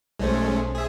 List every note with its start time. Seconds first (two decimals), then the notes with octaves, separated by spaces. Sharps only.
0.19 B1 G#3 A3 C#4 C5
0.75 G#4 E5